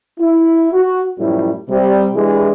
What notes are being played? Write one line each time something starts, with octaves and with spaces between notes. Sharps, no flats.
E4
F#4
F#2 A2 F3 G3 E4
C3 G3
E3 G#3 D4 E4 G4 G#4